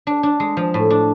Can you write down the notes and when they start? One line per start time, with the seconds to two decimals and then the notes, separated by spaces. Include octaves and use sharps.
0.07 D4
0.23 D4
0.40 G#3
0.57 F3
0.74 A2
0.90 D4